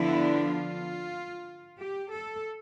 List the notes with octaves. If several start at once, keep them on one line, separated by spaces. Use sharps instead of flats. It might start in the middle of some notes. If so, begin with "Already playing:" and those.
Already playing: D3 F3 B3 D4 E4
F4
G4
A4